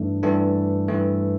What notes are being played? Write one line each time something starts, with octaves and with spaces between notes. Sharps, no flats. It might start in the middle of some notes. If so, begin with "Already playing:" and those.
Already playing: G2 E3 A3 D4
G2 E3 A3 D4
G2 E3 A3